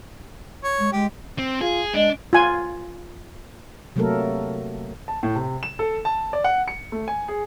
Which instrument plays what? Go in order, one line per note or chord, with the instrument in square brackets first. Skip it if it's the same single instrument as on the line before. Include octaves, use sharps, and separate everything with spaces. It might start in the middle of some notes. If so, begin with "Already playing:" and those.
[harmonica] C#5
[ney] G#3
[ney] G#3 [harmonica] G4
[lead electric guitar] C4
[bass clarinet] F4 [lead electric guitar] G#4
[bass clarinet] G#3 [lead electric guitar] D4
[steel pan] F4 G#5
[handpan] C3 F#3 A3 A#3 A4 A#4
[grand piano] A5
A2
C3
E7
A4
A5
D5
F#5
C#7
A3
G#5
G#4